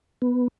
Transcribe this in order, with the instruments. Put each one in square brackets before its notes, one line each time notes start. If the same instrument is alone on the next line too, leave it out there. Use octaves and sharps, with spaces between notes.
[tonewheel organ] B3